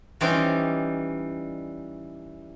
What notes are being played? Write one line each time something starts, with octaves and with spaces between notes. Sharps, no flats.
E3 G3 C#4 D#4 C5 D5